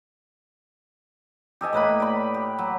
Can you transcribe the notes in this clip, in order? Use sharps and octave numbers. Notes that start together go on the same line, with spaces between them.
G4 A4 D#5 G#5
A2 A#3 B4 B5
D5 B5
G4
F#3